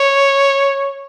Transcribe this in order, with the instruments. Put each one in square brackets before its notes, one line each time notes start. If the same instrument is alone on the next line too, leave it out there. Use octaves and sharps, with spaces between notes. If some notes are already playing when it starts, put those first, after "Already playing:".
Already playing: [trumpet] C#5